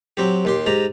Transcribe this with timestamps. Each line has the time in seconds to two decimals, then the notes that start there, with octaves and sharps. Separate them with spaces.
0.17 F#3 C4 G4
0.45 D#2 G4 C6
0.66 G#2 G4 A#5